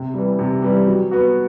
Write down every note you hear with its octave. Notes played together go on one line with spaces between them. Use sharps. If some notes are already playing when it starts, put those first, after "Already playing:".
Already playing: C3
E3 G3
C3
E3 G3
F#3
B3 F#4